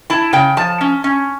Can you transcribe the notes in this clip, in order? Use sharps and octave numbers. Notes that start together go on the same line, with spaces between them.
E4 A5
C#3 G5
F3 A5
C#4
C#4